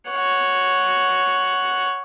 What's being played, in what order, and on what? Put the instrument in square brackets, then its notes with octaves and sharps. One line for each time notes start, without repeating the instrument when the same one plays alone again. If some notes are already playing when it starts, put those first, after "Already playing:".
[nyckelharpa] C#5 F#5